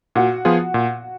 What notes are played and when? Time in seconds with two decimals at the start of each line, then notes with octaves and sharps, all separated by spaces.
0.15 A#2 F#4
0.45 F3 B3 F4 G#4
0.74 A#2